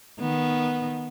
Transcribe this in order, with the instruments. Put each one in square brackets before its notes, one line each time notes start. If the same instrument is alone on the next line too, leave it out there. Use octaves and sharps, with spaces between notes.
[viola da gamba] D#3 B3